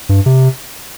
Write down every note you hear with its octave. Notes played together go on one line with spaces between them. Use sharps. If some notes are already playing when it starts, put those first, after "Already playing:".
G2
C3